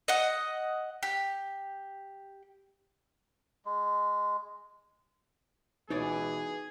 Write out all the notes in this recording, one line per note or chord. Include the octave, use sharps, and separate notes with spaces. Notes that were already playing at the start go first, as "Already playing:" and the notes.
D#5 F#5
G4
G#3
C#2 B2 E3 D#4 G#4 C#5 D5